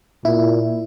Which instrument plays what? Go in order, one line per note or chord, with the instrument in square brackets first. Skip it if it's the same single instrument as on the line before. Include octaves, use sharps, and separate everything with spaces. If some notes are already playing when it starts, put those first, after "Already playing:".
[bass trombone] A#2 [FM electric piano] E4